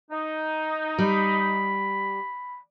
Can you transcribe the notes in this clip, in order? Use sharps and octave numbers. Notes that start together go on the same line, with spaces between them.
D#4
G3 B5